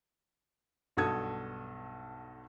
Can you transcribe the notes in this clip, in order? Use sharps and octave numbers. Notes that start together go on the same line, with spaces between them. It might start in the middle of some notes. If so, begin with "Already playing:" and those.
B1 G2 F#4 A4 D#6 G#6